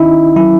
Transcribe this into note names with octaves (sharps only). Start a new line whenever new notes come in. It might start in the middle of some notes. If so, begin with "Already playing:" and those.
Already playing: D#3 C#4 D#4 E4 D#5
F#3 E4